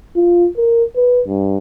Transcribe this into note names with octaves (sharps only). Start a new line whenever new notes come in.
F4
A#4
B4
G2